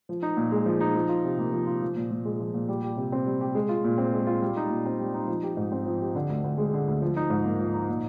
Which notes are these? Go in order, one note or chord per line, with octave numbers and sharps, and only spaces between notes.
F3
D#4
A#2
G#3
F3
D#4
F3
F4
C3
A#3
F3
F4
F3
A#2
A#2
G#3
F3
A#2
G3
G4
C3
C4
G3
G4
G#3
F4
A#2
C4
G#3
F4
G3
D#4
A#2
C4
G3
D#4
F3
G4
G#2
C4
F3
G4
D3
D2
D2
G#3
D3
D2
F3
D#4
G#2
A#3
F3
D#4
A#2